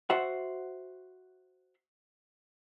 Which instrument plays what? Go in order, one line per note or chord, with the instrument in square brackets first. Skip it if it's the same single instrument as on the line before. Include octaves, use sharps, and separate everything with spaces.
[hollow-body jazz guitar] F#4 C5 E5 F#5